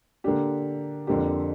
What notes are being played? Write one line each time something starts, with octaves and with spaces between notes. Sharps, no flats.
D3 A#3 D4 G4
F2 D3 A#3 D4 G4